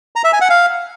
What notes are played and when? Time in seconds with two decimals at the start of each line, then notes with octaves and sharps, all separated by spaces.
0.16 A#5
0.24 E5
0.33 G#5
0.41 F#5
0.50 F5